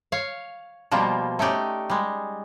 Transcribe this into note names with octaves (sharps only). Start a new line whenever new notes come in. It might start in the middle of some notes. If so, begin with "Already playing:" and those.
C#5 F5
B2 F3 G3 A#3
A3 C#4 D#4 G4 D5
G3 G#3